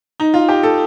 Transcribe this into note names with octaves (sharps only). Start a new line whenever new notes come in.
D#4
F4
G4
A4